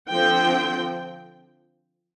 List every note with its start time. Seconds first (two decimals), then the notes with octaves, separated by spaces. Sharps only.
0.11 D3 F3 C4 G5